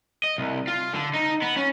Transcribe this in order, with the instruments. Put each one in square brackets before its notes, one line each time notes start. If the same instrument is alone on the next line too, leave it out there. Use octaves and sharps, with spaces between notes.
[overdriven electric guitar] D#5
C2
F4
D3
D#4
B3
C#4